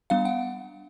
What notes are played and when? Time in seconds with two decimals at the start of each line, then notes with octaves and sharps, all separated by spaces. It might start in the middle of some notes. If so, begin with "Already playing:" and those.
0.10 G3 B3 D4 F5
0.25 F#5